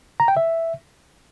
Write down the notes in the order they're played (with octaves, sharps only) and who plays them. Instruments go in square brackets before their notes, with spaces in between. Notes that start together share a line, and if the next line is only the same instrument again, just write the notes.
[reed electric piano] A#5
G5
E5